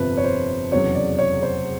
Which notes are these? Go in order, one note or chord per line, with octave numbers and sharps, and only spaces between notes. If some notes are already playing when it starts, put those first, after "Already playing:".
Already playing: G1 F2 C3 F3 B4
C#5
C5
F1 E2 C#3 F#3 C#5
D5
C#5
C5